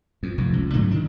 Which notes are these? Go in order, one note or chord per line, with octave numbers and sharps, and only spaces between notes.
F2
F1 F2
C#2
G#2 D3 F#3 A3
D#3 D4